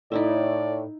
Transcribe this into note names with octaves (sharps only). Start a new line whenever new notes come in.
A2 D#4 E4 D5 E5